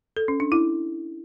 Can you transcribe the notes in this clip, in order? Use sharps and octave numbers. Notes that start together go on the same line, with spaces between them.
A4
C#4
D4
E4